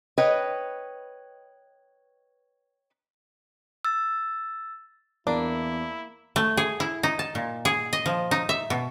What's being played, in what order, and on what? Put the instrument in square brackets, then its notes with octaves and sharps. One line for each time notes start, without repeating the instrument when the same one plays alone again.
[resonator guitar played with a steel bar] B4 C#5 D#5 G5
[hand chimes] E6 A6
[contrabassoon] E2 [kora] A#3 [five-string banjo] D4 [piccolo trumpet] E4
[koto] A3
G#4
E4
D#4
A5
A#2
G#4
D#5
F3
D#4
E5
B2